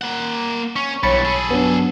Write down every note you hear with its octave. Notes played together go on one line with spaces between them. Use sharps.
A#3 F#5
C#4 C#6
B1 G2 E3 C#5 B5 A6 C#7
G#4 A4
G2 F#3 B3 D4